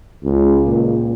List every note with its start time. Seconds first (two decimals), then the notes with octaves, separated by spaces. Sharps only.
0.24 C#2
0.68 A#2